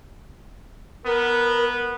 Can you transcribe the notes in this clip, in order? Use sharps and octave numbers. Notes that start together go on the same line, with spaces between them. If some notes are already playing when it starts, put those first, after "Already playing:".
B3 A#4